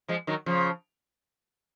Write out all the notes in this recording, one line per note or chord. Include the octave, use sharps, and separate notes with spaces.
F3 G#3
D#3 F#3
C#3 F3